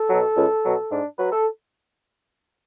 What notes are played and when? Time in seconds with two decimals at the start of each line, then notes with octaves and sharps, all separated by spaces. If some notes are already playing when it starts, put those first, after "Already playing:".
Already playing: A4
0.10 B2 F#3
0.36 C#2
0.65 B2 F#3
0.91 G#2 D4
1.18 F#3 B4
1.32 A4